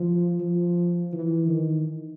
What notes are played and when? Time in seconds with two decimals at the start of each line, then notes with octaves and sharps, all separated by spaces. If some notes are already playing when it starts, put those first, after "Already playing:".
Already playing: F3
0.40 F3
1.13 E3
1.48 D#3